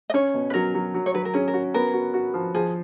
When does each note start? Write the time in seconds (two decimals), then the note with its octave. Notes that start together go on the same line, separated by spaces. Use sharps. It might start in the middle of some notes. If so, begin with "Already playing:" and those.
0.10 D#5
0.14 C#4 C#5
0.34 B2
0.50 B4
0.54 F#3 A#4
0.75 F#3
0.94 F#3
1.06 C#5
1.14 F#3 B4
1.25 A#4
1.34 C#4 G#4
1.48 A#4
1.54 F#4
1.74 B3 A#4
1.93 F#4
2.14 F#4
2.34 F3
2.54 F3 G#4